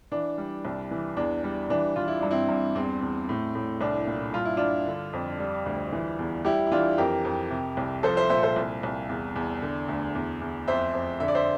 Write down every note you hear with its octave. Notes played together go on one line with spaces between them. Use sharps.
E3 D4
G3
C2
E3
E2 D4
G3
E3 D4
E3 F4
E4
G2 D4
C4 E4
G2
E2 C4
E2
A2
A2
C2 D4
A#2
G2 F4
E4
G2 D4 F4
D3
F2
G3
D2
E3
E2
G3 E4 G4
E4
E3 D4 F4
F2 G4 A#4
F2
C3
C2
F3 A4 C5
C5 E5
A#2 C5 E5
A4 C5
C2
C2
E2
E2
D3
D2
E2
E2
F2 C5 E5
F2
D3 E5
D5
C5 E5